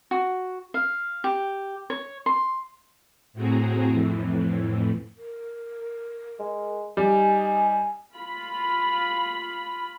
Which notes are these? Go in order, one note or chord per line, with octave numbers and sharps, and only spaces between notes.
F#4
F5
G4
C#5
C6
A2 C4 F#4 G#4 A#5
F2 A2 E3
A#4
G#3
G3 D#4 G#5
F4 B5